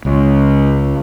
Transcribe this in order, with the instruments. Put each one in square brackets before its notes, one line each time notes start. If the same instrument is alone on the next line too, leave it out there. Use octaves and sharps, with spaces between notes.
[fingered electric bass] C#2